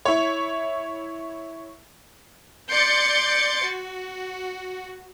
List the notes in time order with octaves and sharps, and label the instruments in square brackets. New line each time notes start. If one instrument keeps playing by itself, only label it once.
[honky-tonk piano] E4 C#5
[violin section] D5 C6 G6 A6 C#7 D7
F#4